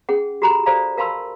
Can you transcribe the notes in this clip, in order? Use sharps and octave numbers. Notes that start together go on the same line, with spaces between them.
C#4 G#4 F#5
F#4 G4 A4 A#5 B5
A4 C5 D5 F5 A#5
A#4 F5 A5 B5 C6 E6